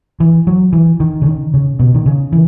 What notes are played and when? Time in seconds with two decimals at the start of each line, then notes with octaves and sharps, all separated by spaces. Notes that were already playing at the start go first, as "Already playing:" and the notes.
0.20 E3
0.47 F#3
0.73 E3
1.00 D#3
1.22 C#3
1.26 D#3
1.54 C#3
1.79 B2
1.95 D#3
2.06 C#3
2.32 E3